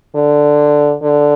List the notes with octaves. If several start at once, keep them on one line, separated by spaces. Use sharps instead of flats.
D3
D3